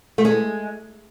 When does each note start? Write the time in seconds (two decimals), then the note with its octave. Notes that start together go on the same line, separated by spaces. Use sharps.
0.18 A3
0.25 G#3